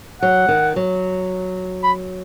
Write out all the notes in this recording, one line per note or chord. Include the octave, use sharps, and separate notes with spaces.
F#3 F#5
D#3
F#3
B5